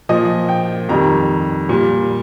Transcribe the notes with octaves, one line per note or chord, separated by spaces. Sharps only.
A#2 F3 D#5
G5
F2 D#3 G3 A#5
A#2 G3